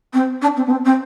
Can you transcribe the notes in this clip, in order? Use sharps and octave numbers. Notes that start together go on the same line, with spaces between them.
C4
D4
C4
B3
C4
C4